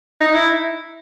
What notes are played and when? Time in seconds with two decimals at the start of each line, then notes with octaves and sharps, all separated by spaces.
0.21 D#4
0.34 E4